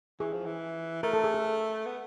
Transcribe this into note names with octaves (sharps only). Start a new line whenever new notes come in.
E3 G#4
F3
E3
A3 A#4
A4
G#4
A4
B3